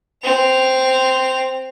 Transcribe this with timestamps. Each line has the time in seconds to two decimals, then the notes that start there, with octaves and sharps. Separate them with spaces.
0.24 C4 F7